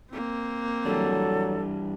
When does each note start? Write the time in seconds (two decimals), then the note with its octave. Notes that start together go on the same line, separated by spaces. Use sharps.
0.11 A#3 C4
0.85 E3 F#3 G3 D4 A4